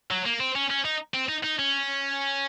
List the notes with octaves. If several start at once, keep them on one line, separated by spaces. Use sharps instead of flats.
F#3
A#3
C4
C#4
C#4
D#4
C4
D#4
D#4
C#4